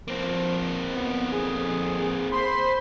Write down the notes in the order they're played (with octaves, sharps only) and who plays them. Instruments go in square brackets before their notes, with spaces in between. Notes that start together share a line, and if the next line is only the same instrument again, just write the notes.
[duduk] F3 [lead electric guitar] A#3 C4
[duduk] B3
[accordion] F2 [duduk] G#4
[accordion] C5 B5 C6